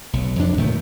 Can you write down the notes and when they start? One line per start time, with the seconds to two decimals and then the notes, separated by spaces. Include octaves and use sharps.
0.13 B1
0.39 F2 D4
0.57 C#2 A#2 D#3 A3